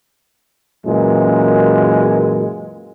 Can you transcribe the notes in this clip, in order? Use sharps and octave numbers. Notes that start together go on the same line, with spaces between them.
F#2 A#2 E3 G#3